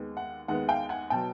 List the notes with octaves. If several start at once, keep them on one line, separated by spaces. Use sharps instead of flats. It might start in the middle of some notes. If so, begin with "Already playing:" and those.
Already playing: D#2 D#3 G#3 B3
F#5
D#2 D#3 G#3 B3 F#5
F5 G5
F#5 G#5
B2 F#3 G5 A5